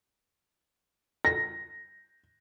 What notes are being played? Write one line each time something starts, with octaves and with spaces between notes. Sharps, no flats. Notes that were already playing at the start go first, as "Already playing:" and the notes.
A#6